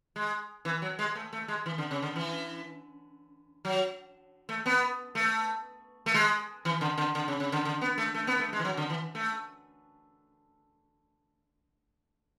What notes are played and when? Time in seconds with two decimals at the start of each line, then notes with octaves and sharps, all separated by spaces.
0.16 G#3
0.65 E3
0.82 F#3
0.99 G#3
1.15 A3
1.33 A3
1.48 G#3
1.66 E3
1.78 D3
1.91 C#3
2.02 D3
2.16 E3
3.65 F#3
4.49 A3
4.66 B3
5.15 A3
6.06 A3
6.14 G#3
6.65 E3
6.81 D3
6.98 D3
7.15 D3
7.28 C#3
7.40 C#3
7.52 D3
7.65 D3
7.81 B3
7.98 A3
8.14 A3
8.27 B3
8.39 A3
8.53 G#3
8.59 E3
8.65 F#3
8.77 D3
8.90 E3
9.15 A3